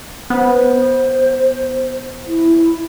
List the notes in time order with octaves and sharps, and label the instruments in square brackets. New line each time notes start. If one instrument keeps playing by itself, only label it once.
[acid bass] B3 [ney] C5
[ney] E4